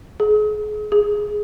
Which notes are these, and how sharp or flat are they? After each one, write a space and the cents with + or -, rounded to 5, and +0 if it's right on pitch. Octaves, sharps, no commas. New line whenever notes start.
G#4 +35
G#4 +5